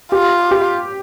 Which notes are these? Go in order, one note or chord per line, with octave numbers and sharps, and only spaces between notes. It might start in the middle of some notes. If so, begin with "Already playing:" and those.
F4 G4
G4